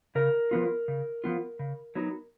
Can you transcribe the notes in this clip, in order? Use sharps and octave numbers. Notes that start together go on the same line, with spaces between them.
C#3 A#4
F3 B3 F4
C#3
F3 B3 F4
C#3
F#3 B3 D#4